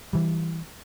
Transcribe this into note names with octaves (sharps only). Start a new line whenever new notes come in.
E3 G3